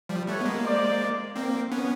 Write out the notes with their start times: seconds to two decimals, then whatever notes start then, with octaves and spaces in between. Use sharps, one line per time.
0.09 F3 G3
0.28 G3 A3 B4 C#5
0.41 B3
0.45 G#3 A#3
0.64 C5 D5
1.36 A#3 C4
1.72 B3 C#4